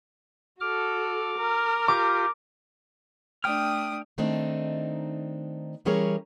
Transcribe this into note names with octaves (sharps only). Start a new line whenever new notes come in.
F#4 A4 D6 F6
A#4
F4 G4 D6
A3 D4 G5 D#6 F6
D#3 A3 C4 D4 D#4
E3 G3 C#4 G#4 A#4 C#5